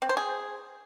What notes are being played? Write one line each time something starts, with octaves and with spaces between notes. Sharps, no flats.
C4
C5
G#4